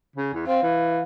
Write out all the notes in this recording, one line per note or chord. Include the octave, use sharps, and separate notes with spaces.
C#3
E2
C4 F5
E3